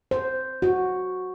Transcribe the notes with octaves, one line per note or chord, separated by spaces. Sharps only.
C5
F#4